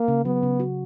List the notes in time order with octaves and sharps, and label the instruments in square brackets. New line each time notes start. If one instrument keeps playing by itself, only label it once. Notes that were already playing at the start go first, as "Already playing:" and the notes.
Already playing: [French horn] A#3
[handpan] C#3
[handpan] F#3 [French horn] B3
[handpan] C#3
F#4